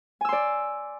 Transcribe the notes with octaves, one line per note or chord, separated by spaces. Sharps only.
D5 G#5 C6 E6